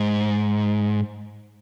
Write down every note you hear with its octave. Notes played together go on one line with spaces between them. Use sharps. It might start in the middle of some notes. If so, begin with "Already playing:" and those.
Already playing: G#2